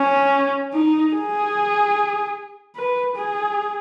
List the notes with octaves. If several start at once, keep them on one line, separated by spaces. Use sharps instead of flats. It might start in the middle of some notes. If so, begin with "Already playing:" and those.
Already playing: C#4
D#4
G#4
B4
G#4